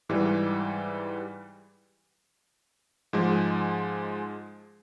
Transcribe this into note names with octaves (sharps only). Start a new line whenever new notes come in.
G#2 E3 G3
G#2 F3 G#3